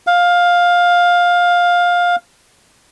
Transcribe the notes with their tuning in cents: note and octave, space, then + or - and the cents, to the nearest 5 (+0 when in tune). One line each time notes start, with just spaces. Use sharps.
F5 +15